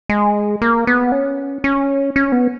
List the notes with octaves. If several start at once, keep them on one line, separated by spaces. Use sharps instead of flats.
G#3
A#3
B3
C#4
C#4
C#4
B3